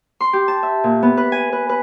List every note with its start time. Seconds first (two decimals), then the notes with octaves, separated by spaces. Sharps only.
0.21 C6
0.33 G4
0.48 A5
0.63 E5
0.84 A#2
1.03 B3
1.17 B4
1.32 G#5
1.52 B4
1.69 B4